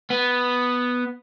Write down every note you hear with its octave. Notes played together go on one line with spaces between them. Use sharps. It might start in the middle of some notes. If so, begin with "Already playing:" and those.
B3